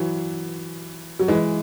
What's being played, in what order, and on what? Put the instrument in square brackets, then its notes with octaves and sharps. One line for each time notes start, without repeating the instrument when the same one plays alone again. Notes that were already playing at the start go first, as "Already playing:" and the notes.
Already playing: [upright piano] E3 F#3
F#3
E3 G#3